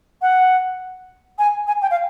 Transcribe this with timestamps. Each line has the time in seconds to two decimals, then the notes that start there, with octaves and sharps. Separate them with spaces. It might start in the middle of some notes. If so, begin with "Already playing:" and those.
0.22 F#5
1.39 G#5
1.67 G#5
1.82 G5
1.91 F5